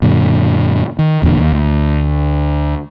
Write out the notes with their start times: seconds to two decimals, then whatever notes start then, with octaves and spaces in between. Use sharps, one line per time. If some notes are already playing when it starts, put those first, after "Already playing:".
0.02 F#2 A#2 D3
0.99 D#3
1.22 D#1 E2 A#2 D3
1.39 D#2
1.52 D2